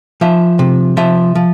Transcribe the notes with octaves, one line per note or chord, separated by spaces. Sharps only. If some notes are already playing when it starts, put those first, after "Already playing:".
F3 E5
C3
F3 E5
F3